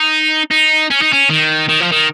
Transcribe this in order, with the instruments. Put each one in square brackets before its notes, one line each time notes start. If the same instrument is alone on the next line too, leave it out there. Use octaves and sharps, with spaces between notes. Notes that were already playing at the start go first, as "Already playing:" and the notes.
Already playing: [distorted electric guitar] D#4
D#4
C#4
D#4
C#4
D#3
D#3
F3
D#3